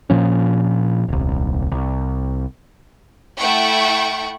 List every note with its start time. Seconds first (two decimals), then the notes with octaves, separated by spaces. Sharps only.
0.10 A#2 F3 C#4
1.08 D#1 C2
1.72 C2
3.37 A3 E4 F#5 G5 C#6